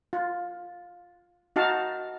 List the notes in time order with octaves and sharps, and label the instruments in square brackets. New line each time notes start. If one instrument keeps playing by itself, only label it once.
[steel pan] F4
D#4 F#4 F5 A5